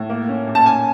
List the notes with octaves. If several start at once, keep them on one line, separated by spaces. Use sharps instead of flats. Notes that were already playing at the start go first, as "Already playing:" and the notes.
Already playing: A2
A#3
C#4
A#2
A5
C#4 G#5